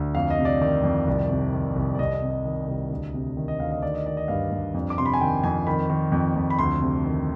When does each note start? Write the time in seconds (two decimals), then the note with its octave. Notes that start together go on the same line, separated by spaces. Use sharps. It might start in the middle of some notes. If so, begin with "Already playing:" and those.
Already playing: D2
0.15 F2 F5
0.30 D#5
0.39 C3
0.45 D5
0.61 D#3 D5
0.84 F2
1.08 C2
1.30 C3
1.54 D#3
1.76 C2
1.95 D5
1.99 C2 D#5
2.14 D#5
2.22 C3
2.30 D#5
2.45 D#3
2.68 C2
2.91 D2
3.14 C3
3.37 D#3
3.48 D#5
3.60 D2 F5
3.72 D#5
3.82 D#3 D5
3.94 D#5
4.06 D#3 D5
4.17 D#5
4.28 G2 F5
4.52 G2
4.74 F2
4.90 D6
4.98 C3 C6
5.06 B5
5.13 G#5
5.21 D#3 G5
5.43 F2 G#5
5.67 D#3 B5
5.90 D#3
6.12 F2
6.36 F2
6.50 B5
6.59 D2 C6
6.81 C3
7.05 D#3